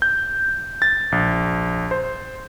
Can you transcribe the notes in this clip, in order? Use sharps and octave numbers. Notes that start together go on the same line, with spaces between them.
G6
A6
A#1
C5